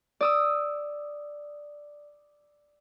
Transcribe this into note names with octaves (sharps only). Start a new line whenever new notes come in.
D5 D#6 E6